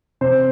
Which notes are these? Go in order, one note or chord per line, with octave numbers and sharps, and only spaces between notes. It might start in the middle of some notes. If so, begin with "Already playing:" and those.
C3 C5